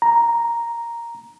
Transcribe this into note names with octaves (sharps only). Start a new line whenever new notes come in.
A#5